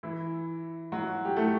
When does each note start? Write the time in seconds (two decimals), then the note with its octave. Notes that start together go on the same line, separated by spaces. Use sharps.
0.03 E3 E4
0.92 F#3 F#4
1.25 G4
1.36 A3 A4